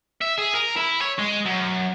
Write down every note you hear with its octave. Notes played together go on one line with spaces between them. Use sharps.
E5
G#4
A#4
E4
C#5
G#3
F#2